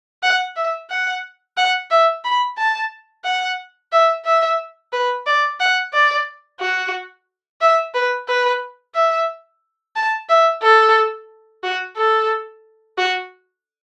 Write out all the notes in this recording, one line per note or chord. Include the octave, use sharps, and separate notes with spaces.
F#5
E5
F#5
F#5
E5
B5
A5
F#5
E5
E5
B4
D5
F#5
D5
F#4
E5
B4
B4
E5
A5
E5
A4
F#4
A4
F#4